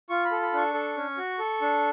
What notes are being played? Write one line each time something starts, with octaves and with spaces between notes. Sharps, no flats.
F4 C#6
B5
A4
B5
D4 C#6
A4
C#4
F#4
A4
D4